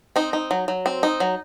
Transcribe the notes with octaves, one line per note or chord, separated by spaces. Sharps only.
C4 D#4
D#4
F#3
F#3
C4
D#4
F#3